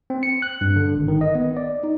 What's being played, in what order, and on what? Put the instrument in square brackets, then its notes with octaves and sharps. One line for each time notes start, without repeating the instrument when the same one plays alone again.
[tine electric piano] C4
C#7
F#6
G2
D3
G#1
D#3
D#5
B3
D5
D#4